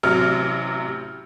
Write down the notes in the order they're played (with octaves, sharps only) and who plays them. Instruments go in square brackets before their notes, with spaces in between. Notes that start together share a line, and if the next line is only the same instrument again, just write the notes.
[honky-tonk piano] A1 C3 F#3 F6